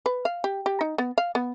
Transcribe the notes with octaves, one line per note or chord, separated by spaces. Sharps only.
B4
F5
G4
G4
D#4
B3
F5
B3